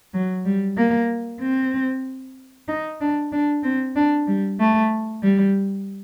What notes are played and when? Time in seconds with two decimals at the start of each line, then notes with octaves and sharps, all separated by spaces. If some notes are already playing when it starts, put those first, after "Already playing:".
0.14 F#3
0.46 G3
0.77 A#3
1.41 C4
2.68 D#4
3.01 D4
3.32 D4
3.63 C4
3.96 D4
4.28 G3
4.60 A3
5.23 G3